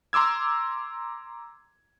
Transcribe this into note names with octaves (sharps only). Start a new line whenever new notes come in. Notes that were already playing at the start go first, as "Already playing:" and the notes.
A#5 C6 D6 E6 G#6